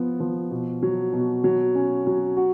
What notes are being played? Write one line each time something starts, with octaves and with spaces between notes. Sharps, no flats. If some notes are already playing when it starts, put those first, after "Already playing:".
Already playing: F3 B3
F3
B2
F#3
B2
F#3
C#4
F#3
F#4